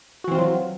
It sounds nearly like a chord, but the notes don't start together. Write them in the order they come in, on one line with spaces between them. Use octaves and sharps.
F#4 E3 C4 F4 F#3